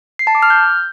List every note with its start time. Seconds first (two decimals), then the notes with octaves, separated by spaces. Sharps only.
0.19 C7
0.27 A5
0.35 D6
0.43 F6
0.50 G6